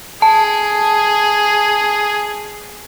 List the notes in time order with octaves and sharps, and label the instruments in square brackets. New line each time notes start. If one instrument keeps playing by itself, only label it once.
[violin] G#4 [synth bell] A5